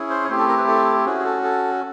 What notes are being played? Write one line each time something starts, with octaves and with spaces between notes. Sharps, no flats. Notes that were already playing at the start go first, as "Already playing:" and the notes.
Already playing: C#4 E4 G#4
C5
C#5
A3 C4 E4 G4 C5
A4
A#4
B4
A4
C#4 F#4 G#4
G#4
A4
A4